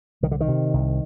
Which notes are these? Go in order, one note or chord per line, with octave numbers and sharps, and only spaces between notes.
C2 D#3
D3
D#3
C3
C2